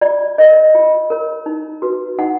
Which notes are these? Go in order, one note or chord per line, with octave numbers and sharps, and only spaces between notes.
F4 D5
A#4 C#5 D#5
F4
A#4 C#5
D#4
F#4 B4
D#4 F#5